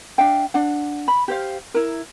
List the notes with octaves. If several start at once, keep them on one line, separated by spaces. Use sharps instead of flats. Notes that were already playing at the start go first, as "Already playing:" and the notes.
D4 E5 F5 G5
D4 F#5
B5
G4 C5 F5
E4 A#4